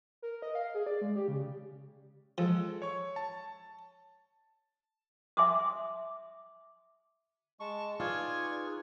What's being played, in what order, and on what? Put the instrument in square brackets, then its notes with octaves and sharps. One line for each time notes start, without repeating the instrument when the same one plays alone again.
[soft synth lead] A#4
D#5
F5
G#4
D5
G#3
G4
C#3
[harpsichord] F3 [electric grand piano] G#3 A4
[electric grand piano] C#5 C#6
A5
[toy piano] E5 G#5 C6 D6 D#6
[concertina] G#3 C#6 [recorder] A5
[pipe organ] D#4 G#4 B4 [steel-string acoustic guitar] F4 [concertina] D5 G#5 C#6 [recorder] G#6